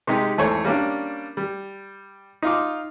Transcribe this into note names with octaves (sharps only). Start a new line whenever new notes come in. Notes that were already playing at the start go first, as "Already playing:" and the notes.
C3 G#3 D#4 G4
G#1 E2 A3 C5 C#5
G3 A#3 C#4 D4
G3
D#4 F4 D6